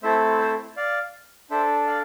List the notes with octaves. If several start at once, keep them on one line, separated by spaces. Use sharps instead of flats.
A3 C4 E4 A4 C5 E5
C5 E5
D5 F5
D4 A4 C5 E5
D5 F5